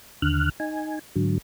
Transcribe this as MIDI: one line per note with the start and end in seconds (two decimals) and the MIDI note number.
0.22 0.49 39
0.22 0.49 50
0.22 0.49 89
0.22 0.49 90
0.60 0.99 63
0.60 0.99 80
1.16 1.38 44
1.16 1.38 50
1.16 1.38 54